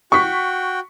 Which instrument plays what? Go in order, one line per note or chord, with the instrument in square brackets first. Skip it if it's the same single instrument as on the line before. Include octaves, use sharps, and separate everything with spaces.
[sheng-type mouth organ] F#4 G5 [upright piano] C#6 B6